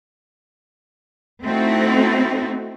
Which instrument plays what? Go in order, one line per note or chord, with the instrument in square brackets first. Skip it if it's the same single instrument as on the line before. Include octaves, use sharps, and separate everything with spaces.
[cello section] A3 C4 D#4 E4 F#4